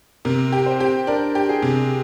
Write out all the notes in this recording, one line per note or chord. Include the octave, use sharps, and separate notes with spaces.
C3 A#4
G4
C5
G4
D4 A#4
G4
G#4
C3